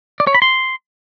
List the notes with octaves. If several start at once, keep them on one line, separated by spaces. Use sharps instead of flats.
D5
C#5
B5
C6